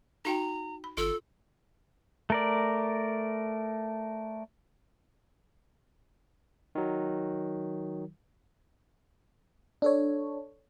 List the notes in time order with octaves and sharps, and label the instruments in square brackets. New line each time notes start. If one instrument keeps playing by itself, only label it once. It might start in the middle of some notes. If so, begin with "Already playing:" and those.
[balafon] D#4 F#4 G5 [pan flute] A#5
[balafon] B5
[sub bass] G1 [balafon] F4 [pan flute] A4
[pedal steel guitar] A3 A#4 D5
[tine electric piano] D#3 F#3
[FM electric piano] D4 A4 C#5